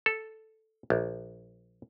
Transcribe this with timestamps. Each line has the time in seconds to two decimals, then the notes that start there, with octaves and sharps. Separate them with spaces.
0.06 A4
0.90 A#1